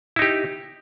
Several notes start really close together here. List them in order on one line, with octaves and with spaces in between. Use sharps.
E4 D#4 G4